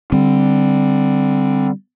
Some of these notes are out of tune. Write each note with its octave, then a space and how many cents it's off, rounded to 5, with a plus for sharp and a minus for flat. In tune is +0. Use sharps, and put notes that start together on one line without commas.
D3 +0 G3 +0 C4 +0